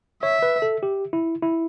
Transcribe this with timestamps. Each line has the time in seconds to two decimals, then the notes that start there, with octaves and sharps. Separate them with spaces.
0.23 C#5 E5
0.43 B4
0.62 A4
0.83 G4
1.13 E4
1.42 E4